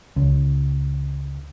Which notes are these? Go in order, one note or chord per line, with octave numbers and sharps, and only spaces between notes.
C#2